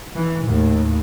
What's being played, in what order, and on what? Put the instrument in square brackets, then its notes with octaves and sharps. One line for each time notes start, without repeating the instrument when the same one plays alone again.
[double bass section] E3
D#2 A2